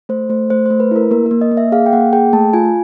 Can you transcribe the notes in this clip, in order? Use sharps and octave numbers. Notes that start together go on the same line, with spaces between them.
A3 C5
A3 C5
A3 C5
A3 C5
B4
E4 A#4
A#3 A#4
A#3 A#4
D#5
A#3
E5
G#4 F5
G5
A#3 F#5
G#4 G5
A3 A5
F4 G#5